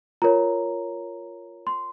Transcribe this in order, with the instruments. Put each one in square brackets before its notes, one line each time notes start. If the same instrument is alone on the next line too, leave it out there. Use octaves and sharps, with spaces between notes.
[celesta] F4 A#4 C#5 A#5
C6